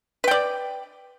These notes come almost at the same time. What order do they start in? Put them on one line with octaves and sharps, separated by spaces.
B4 G5 D5